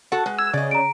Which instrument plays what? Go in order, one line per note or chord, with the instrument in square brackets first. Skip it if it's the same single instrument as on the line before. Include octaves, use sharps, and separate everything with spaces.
[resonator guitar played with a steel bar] F#4 A4 F#5
G#3 B4
[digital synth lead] E6 [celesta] G#6
[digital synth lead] C#3 [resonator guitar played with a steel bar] D5 D#5
[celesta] A#5 D7